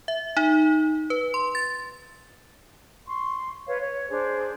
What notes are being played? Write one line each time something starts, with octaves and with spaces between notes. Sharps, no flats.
E5
D#4
B4
C6
A6
C6 C#6
B4 C#5 F5
C#5
D4 G#4 C5